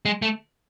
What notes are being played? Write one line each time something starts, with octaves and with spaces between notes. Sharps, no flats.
G#3
A3